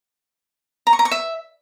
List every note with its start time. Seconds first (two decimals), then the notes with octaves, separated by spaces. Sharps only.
0.87 A#5
0.93 C#6
0.99 A#5
1.05 C#6
1.11 E5